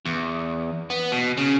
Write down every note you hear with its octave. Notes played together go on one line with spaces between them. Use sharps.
E2
B3
B2
C#3